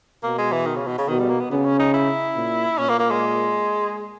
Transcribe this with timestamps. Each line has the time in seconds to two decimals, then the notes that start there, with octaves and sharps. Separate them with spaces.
0.23 B2 A#3
0.38 G#3
0.52 E3
0.66 D#3
0.76 C#3
0.87 B2
0.98 C#3
1.09 B2 D#3
1.19 G3
1.30 A#3
1.40 B3
1.51 C#3 B3
1.66 C#4
1.79 D#4
1.94 E4
2.36 A#2
2.78 A#2 C#4
2.89 A#3
2.99 A#3
3.10 G#3